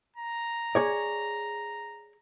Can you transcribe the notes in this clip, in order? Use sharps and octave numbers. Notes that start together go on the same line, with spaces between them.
A#5
G#4 C#5 D5